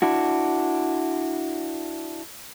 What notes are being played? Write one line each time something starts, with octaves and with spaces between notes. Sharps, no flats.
D4 E4 F#4